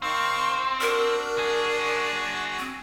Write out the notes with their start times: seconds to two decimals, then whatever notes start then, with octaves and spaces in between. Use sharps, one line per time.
0.02 D#3 C4 F5 C#6
0.81 D4 F#4 A#4
1.38 F#3 G#4
2.59 C4